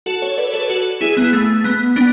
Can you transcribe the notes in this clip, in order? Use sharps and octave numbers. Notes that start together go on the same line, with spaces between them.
F#4 A4
A4 C#5
B4 D5
A4 C#5
F#4 A4
E4 G#4
B3
A3
B3
B3 D4